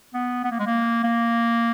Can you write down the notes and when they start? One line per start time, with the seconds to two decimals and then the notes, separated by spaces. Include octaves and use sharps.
0.14 B3
0.44 B3
0.51 A#3
0.59 G#3
0.66 A#3
1.04 A#3